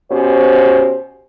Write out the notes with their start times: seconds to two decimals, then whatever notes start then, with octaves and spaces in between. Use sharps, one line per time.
0.11 B2 C#4 G4 C5